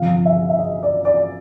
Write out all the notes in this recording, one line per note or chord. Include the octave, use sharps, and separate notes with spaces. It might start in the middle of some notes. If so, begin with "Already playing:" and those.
Already playing: G1 F2 C3 F3 F5
E5
E5
D#5
D5
D5